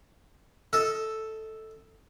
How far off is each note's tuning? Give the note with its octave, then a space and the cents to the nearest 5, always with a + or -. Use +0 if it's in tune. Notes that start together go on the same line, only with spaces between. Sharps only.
A4 +0 D#5 +25